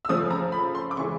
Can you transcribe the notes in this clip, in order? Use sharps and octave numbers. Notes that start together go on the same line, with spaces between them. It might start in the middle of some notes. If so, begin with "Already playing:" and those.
E6
C#3 F3 A3 D#6
A#5
B5
C6
D6
C#3 E3 G#3 C#6